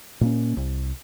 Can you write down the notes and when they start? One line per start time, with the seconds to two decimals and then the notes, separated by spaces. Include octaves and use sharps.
0.21 A#2 A#3 C#4
0.57 C2